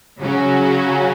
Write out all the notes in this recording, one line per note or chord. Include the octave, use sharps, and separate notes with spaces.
C#3 F#3 C#4 F#4